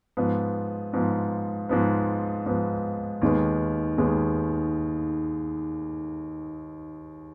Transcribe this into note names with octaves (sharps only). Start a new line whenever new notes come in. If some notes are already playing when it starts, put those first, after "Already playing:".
G#2 F3 B3
G#2 F3 B3
G#2 F3 B3
G#2 F3 B3
D#2 D#3 G#3 B3
D#2 D#3 G#3 B3